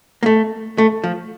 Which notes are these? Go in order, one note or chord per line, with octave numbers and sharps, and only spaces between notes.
A#3
A3
A3
F3